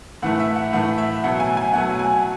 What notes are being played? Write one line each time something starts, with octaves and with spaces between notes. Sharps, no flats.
A2 E3 A3 F#5
E5
F#5
A2 E3 A3 F#5
E5
B2 F#3 A3 F#5
G#5
G#5
B2 F#3 A3 F#5
G#5